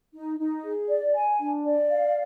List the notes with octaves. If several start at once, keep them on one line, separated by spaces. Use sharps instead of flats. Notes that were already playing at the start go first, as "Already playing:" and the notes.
D#4
D#4
G#4
D5
G#5
D4
D5
F5